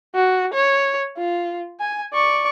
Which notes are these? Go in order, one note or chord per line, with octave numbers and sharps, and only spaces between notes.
F#4
C#5
F4
G#5
D5 C#6